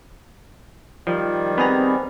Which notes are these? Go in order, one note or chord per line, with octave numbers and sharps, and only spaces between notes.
D#3 F3 G3
B3 C4 G4 G#4 B4 A#5